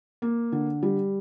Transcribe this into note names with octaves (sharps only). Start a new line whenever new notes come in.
A#3
D3
G3